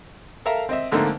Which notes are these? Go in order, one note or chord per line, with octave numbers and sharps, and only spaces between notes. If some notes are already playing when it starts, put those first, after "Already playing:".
A4 A#4 E5 F5 A#5
C4 D#5 E5
G#2 D3 A3 A#3 C4 D#4